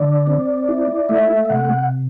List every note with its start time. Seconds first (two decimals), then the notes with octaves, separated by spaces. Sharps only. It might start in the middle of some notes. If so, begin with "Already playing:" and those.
Already playing: D3 D5
0.27 C4
0.69 E4
1.09 A3 E5
1.45 E5
1.49 C3 F#5